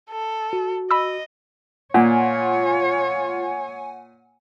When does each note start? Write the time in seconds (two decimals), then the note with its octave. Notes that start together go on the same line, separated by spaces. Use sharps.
0.10 A4
0.53 F#4
0.91 D#5 B5 E6
1.94 A#2 F4 C#5 F#5 G#5